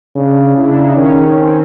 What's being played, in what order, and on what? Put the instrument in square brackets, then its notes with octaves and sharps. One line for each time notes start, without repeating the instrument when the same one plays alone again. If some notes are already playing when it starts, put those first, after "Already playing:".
[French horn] C#3 [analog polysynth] D4
[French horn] C#3 [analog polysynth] E4
[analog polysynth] D4
D#4
[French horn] D#3 [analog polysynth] C#4
[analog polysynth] C4